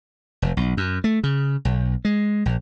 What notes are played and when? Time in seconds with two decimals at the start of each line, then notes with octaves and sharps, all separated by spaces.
0.42 F1
0.57 B1
0.77 F#2
1.04 A3
1.24 C#3
1.65 B1
2.05 G#3
2.46 A#1